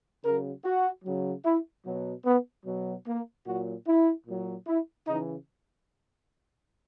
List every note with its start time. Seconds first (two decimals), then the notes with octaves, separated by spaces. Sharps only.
0.23 C#3 F#3 A#4
0.64 F#4
1.04 C#3 F#3
1.44 E4
1.85 B2 F#3
2.25 B3
2.65 B2 F#3
3.06 A#3
3.46 A#2 F#3 F#4
3.86 E4
4.26 A#2 F#3
4.66 E4
5.06 C#3 E3 D#4